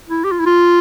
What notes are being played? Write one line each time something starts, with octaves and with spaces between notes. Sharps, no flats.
E4
G4
F4
E4
F4